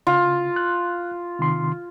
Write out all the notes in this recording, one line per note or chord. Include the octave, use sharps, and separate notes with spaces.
C#3 F4
F#6
C3 D#3 C6